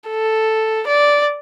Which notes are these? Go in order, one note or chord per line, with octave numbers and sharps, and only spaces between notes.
A4
D5